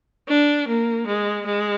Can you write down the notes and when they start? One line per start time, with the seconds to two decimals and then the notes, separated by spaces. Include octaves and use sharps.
0.28 D4
0.67 A#3
1.07 G#3
1.46 G#3